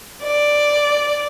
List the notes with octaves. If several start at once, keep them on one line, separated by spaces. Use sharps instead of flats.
D5